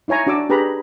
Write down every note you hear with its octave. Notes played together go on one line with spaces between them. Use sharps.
D#4 E4 C#5 G#5 A#5
D4 F#4 D5 D6 E6
D4 G4 G#4 B4 A#5 B5